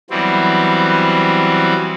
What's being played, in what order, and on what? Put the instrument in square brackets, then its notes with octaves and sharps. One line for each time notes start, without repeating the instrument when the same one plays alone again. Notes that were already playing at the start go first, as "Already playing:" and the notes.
[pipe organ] E3 F#3 G3 B3 C4